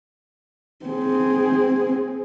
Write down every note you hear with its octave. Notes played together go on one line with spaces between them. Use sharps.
C4 G#4